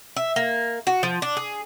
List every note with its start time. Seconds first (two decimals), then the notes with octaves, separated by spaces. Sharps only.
0.16 E5
0.36 A#3
0.87 F#4
1.03 F3
1.22 D4
1.37 G#4